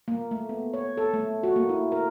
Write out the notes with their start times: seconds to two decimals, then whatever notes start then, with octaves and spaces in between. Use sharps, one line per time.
0.08 A#3
0.31 A3
0.49 B3
0.73 C#5
0.97 A4
1.14 A3
1.43 F#4
1.56 A#3
1.69 E4
1.92 A#4